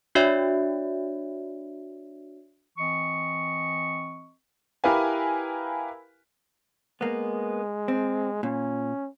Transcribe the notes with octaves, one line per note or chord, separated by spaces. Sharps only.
D4 F#4 C#5 D5 E5
E3 C4 D#5 C#6
E4 G4 A#4 B4 F5 G#5
G#3 A#3 B3
C4
A#2 C#4